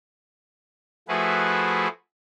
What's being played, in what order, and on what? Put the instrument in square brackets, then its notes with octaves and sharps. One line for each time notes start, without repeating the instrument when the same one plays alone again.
[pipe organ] F3 A3 E4 F#4 G#4 B4